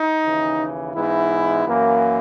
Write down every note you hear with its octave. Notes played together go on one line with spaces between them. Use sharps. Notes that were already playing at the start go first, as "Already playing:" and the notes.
Already playing: D#4
D#2 C#3 E3
G#2 E3 G#3 B3 E4
F#2 E3 A#3